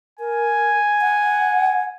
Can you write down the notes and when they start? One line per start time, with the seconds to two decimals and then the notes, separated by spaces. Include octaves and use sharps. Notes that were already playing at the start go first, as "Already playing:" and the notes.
0.20 A#4 G#5
1.01 F#5